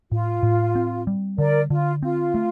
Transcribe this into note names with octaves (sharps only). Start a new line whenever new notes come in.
A2 F4
A2
C4
G3
D3 A#4 D5
D3 F4
C4 F4
A3